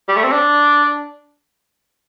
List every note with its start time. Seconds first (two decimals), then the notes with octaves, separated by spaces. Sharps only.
0.08 G3
0.16 A3
0.24 C4
0.32 D4